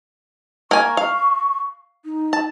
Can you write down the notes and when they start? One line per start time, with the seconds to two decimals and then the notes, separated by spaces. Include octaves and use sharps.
0.71 A#3 G#5 C#6
0.97 F5
2.05 D#4
2.33 A5